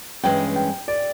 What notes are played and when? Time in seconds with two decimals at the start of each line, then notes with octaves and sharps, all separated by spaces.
0.23 G2 E3 G#3 C#4 G5
0.56 G5
0.88 D5